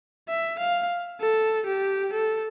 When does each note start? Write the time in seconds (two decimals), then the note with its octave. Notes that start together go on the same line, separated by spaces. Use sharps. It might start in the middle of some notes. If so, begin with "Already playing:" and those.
0.29 E5
0.59 F5
1.21 A4
1.67 G4
2.13 A4